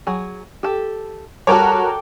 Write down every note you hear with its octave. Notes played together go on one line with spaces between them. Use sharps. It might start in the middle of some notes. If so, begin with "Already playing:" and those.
F#3 G#4
G4 A4
G3 F#4 A4 A#4 C#5 G5 D6